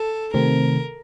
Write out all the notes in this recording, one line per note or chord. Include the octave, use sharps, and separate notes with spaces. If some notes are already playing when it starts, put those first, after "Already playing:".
Already playing: A4
C3 D#3 A3 C4 A#4